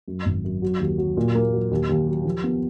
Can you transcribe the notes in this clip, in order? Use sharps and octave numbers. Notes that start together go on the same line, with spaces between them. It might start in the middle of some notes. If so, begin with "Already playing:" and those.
F#2
G#1
F#2
F#3
D#2
F#3
A#2
A#3
F#3
D#2
D#2
F#3
F3
B3